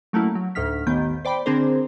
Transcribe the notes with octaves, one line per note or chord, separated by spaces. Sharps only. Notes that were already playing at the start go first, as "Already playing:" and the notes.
F#3 A3 A#3 C#4 E4
F#3
D2 A2 D#4 F6 B6
A1 D#2 D#3 B3 G6
C5 D5 G5 B5
D3 C4 D4 G#4 A#4 C5